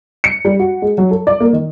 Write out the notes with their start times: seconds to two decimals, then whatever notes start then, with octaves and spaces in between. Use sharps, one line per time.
0.24 C#7
0.45 G3
0.60 F#4
0.82 G#3
0.98 F#3
1.11 A4
1.27 D5
1.40 A#3
1.53 D#3